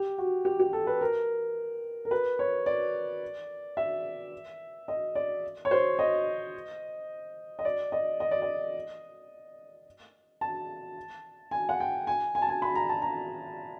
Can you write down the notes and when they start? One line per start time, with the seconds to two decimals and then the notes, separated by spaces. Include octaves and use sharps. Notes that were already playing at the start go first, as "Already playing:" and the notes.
Already playing: G4
0.18 F#4
0.45 G4
0.60 G4
0.73 A4
0.87 B4
1.01 A#4
2.05 A#4
2.11 B4
2.39 C#5
2.66 D5
3.77 E5
4.88 D#5
5.15 D5
5.65 C#5
5.71 C5
5.99 D#5
7.59 D#5
7.65 D5
7.92 D#5
8.20 D#5
8.31 D5
8.42 D#5
10.41 A5
11.51 G#5
11.69 F#5
11.80 G5
12.07 G#5
12.35 G#5
12.42 A5
12.49 G#5
12.62 B5
12.75 A#5
12.89 A5
13.02 A#5